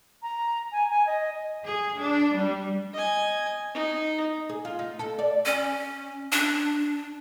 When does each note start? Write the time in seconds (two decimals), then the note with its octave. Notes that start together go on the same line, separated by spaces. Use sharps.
0.22 A#5
0.72 G#5
0.90 G#5
1.06 D#5
1.63 G#4
1.99 D4
2.37 G3
2.94 D#5 G#5
3.74 D#4
4.49 G#4
4.65 F4
4.79 D#4
4.99 A4
5.19 D5
5.45 C#4
6.32 D4